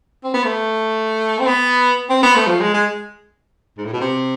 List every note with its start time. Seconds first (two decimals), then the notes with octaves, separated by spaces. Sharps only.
0.23 C4
0.34 B3
0.44 A3
1.39 C4
1.46 B3
2.09 C4
2.23 B3
2.36 A3
2.47 F3
2.61 G#3
2.74 G#3
3.77 G#2
3.85 A2
3.93 B2
4.00 C3